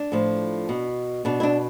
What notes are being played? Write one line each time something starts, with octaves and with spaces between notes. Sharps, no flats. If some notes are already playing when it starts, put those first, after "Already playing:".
Already playing: D4
A2 F3
B2
B2 D4
E4
D4